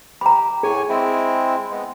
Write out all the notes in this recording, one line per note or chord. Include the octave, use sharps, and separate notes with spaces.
G4 A#5 B5
A2 G#4 C#5 G#5
G#3 C4 E4
G#3 B3